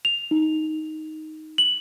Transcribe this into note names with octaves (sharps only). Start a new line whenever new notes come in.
F7
D#4
F#7